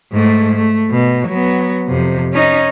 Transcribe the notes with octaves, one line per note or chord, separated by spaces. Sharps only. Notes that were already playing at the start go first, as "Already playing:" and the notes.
G#2 A3
A3
B2
F#3 B3
F2 C3
C#4 D#4